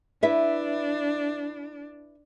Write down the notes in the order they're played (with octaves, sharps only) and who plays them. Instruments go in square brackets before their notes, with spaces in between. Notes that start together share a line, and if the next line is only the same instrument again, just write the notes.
[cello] D4 [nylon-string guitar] E4 B4 E5